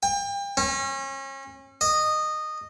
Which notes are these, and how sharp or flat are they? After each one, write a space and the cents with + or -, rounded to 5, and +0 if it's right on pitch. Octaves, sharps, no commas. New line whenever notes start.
G5 +35
C#4 -35
D#5 -15